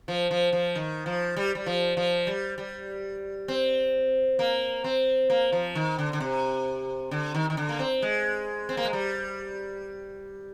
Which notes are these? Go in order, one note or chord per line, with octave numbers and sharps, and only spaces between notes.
F3
F3
F3
D#3
F3
G3
G3
F3
F3
G3
G3
C4
A#3
C4
A#3
F3
D#3
D3
D3
C3
D3
D#3
D#3
D3
A#3
C4
G#3
C4
A#3
G#3
G3